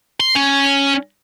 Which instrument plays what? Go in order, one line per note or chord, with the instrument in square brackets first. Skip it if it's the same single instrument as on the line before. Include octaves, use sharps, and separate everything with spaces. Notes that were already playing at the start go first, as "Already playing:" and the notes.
[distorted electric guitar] C6
C#4